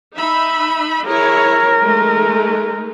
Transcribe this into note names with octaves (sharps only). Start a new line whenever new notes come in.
D#4 E5 B5
E4 G#4 A#4 C#5
G#3 A3 D#4